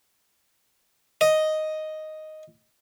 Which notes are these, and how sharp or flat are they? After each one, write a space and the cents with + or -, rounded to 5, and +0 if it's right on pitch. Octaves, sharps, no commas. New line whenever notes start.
D#5 +0